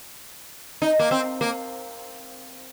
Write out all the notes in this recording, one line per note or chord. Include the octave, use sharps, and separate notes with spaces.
D#4
A#3
C4
A#3